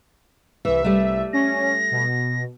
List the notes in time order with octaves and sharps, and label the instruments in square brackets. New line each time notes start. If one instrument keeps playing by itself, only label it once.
[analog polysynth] C2 E5 [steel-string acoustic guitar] E3
[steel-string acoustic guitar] G3 A3
[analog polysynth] C#4 [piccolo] A#6
[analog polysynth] B2